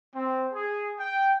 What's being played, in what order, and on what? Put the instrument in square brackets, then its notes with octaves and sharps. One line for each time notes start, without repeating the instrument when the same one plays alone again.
[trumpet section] C4
G#4
G5